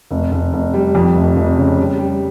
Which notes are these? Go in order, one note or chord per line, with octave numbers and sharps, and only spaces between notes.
F1
F1
F1
G3
F2
F1
F1
C#3
G3
G3